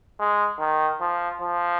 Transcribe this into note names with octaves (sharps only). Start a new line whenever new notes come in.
G#3
D#3
F3
F3